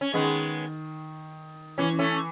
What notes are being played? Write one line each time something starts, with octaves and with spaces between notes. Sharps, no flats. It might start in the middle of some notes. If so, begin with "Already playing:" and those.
C#4
D#3 G#3 B3
E3 C#4
A3 C#4